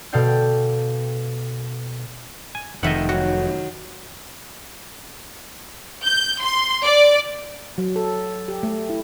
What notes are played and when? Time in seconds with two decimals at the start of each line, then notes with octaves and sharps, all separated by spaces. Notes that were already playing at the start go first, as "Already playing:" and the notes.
0.13 B2 A4 D5 F5 G5 G6
2.55 G#5
2.83 F1 D#3 E4 A4 D#5 E5 F#5
3.09 F#3 F#4
6.04 G6
6.41 C6
6.83 D5
7.78 F#3
7.96 A4
8.48 G4
8.63 A3
8.90 E4